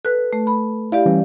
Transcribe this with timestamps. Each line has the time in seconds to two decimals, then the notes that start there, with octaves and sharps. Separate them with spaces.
0.05 A4 B4 F#6
0.33 A3
0.47 B5
0.92 E4 G4 D5 F5
1.06 E3 G3 C#4